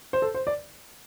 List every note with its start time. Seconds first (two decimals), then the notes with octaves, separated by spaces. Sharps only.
0.13 C5
0.22 A4
0.34 C5
0.47 D5